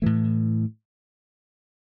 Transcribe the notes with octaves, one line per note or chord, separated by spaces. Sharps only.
A2 E3 A3